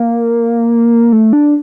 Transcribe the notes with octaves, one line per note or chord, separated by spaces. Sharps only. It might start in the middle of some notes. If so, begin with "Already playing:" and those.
Already playing: A#3
A3
D4